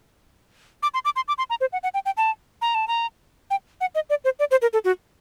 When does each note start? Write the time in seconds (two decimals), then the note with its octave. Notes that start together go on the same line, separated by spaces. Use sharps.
0.83 D6
0.94 C6
1.05 D6
1.16 C6
1.28 D6
1.38 C6
1.50 A#5
1.61 C5
1.73 F#5
1.83 F#5
1.94 G5
2.06 G5
2.17 A5
2.62 A#5
2.75 A5
2.88 A#5
3.51 G5
3.81 F#5
3.95 D#5
4.10 D5
4.24 C5
4.39 D5
4.51 C5
4.62 A#4
4.73 A4
4.85 F#4